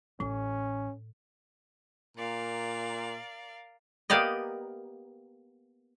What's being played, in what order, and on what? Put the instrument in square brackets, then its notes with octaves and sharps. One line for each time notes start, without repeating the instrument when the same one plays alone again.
[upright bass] A1 [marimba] A2 [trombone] C#4
[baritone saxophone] A#2 [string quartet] A#4 D5 F5
[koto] A#3 B3 G4 D5 D#5